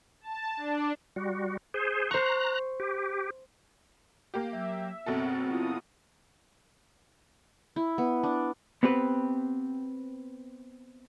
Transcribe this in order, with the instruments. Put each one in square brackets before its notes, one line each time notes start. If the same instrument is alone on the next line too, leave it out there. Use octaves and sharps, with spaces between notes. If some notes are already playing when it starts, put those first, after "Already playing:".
[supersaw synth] A5
D4
[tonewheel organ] G3 F#4
G#4 C5
[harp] C5 C#6 [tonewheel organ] A#5 F#6
[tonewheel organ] G4
[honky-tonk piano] A#3 G4 [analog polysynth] F5
[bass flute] F#3 [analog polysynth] E5
[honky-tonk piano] F#1 B2 A4 [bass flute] C4
[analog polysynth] E4 F4 D#6
[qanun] E4
B3
D4
[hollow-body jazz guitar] B3 C4 G4 B4